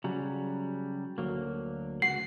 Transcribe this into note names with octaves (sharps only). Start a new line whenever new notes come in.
C#3 F#3 G3
D2 F#3 A#3
C#2 F#4 F#5 C7